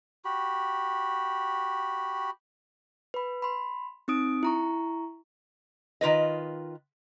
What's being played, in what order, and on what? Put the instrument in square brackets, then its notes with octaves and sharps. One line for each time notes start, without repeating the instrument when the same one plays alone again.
[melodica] F#4 G4 B5
[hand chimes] B4 B5
B5 C6
C4 D#4 D#6 D7
E4 A#5 C#6
[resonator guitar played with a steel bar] D#3 F4 B4 D#5